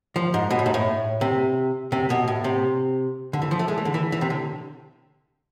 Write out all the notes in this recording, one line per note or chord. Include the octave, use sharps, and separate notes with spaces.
F3
G#2
B2
A2
G#2
A2
C3
C3
B2
A2
C3
D3
E3
F3
A3
G#3
E3
D3
E3
E3
C3
D3